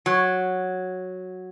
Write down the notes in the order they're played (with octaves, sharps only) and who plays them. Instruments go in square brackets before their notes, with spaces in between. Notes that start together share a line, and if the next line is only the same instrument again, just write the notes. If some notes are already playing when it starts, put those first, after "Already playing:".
[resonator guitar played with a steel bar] F#3